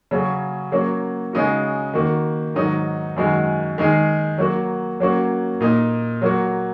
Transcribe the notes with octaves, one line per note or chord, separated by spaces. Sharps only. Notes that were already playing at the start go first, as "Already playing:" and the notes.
C#3 F#3 C#4
F#3 A#3 C#4 F#4
C#3 G#3 D#4 F#4
D#3 A#3 F#4
G#2 D#3 F#3 D#4 F#4
F#2 D#3 G#3 F#4
D#3 G#3 D#4 G#4
F#3 A#3 F#4
F#3 A#3 C#4 F#4
A#2 A#3 D#4
F#3 A#3 F#4